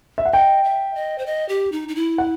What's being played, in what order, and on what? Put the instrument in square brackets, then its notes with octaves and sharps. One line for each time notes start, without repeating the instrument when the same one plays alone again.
[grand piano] E5
F#5
[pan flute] D#5 [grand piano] G5
[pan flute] E5
D#5
C5
D#5
G4
D#4
D#4
E4
[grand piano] F#5